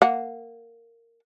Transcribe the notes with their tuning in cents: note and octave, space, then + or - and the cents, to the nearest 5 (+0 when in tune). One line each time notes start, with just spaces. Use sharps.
A#3 -15 F#5 +0